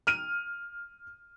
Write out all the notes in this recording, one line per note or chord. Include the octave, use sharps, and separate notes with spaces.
F6 D#7